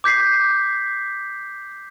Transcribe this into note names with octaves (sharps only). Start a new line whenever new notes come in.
D6 G6 B6 C7